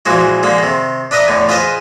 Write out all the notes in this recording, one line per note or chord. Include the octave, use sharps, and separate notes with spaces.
A#1 E3 F3 G#3 F#4
D3 G#3 A#3
C3 D#3
D4 B4 D#5 E5 A#5
E2 A2 D3
F4 G#4 B4 C5 D#5